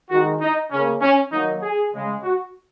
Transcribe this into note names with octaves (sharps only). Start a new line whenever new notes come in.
D#3 G#3 F#4
D#4
C#3 A#3 C#4
C#4
D#3 F#3 A#3 D#4
G#4
C#3 G#3
F#4